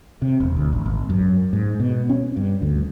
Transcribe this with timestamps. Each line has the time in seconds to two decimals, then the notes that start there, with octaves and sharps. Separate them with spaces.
0.22 C3
0.40 E1
0.56 D2
0.73 A1
0.86 G#1
1.10 F#2
1.53 G#2
1.80 B2
2.09 C#4
2.37 G2
2.62 D2